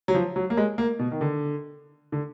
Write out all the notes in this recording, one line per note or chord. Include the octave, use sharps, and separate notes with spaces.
F#3
F3
F#3
A#3
G#3
A#3
B2
D#3
D3
D3